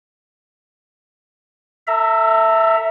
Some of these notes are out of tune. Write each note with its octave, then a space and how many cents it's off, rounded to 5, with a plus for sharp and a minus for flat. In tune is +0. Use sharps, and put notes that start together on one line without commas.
A4 +35 E5 +0 A#5 +0